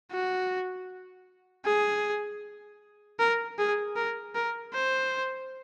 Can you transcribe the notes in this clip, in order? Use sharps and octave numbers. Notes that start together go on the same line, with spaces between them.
F#4
G#4
A#4
G#4
A#4
A#4
C5